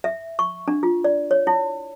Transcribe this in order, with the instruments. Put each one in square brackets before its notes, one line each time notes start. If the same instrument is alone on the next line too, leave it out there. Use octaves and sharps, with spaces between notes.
[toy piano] E5
C#6
D4
F4
D5
C#5
E4